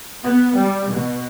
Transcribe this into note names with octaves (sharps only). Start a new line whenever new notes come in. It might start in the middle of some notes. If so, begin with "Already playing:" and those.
B3
G3
B2